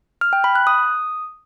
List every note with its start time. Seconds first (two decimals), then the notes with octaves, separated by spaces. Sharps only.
0.21 F6
0.33 G5
0.44 B5
0.55 F#6
0.67 D#6